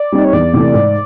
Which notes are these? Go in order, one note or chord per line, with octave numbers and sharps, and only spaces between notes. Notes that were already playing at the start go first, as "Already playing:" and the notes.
Already playing: D5
G3 C4 D#4
C#5
E2 D5
C3 E3 A3
G#2